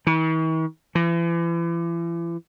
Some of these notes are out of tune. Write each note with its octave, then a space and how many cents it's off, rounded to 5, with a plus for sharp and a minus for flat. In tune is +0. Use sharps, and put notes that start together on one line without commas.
E3 -45
E3 +40